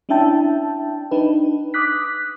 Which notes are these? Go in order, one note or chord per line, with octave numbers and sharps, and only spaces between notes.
C#4 D4 E4 E5 G5 A5
D4 D#4 B4
D6 D#6 F#6 B6